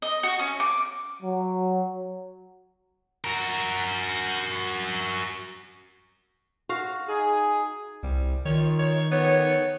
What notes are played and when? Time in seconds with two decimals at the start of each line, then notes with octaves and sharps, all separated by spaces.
0.02 D#5
0.23 F#4
0.39 C#4
0.60 D6
1.22 F#3
3.24 F#4 A#4
6.69 F#4 F5
7.08 D#4 G#4
8.03 C2 G3
8.45 D#3 F4 C#5
8.79 C#5
9.12 B3 C#5